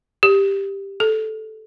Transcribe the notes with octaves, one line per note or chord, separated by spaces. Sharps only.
G4
A4